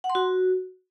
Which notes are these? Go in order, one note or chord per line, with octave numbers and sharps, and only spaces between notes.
F#5
C6
F#4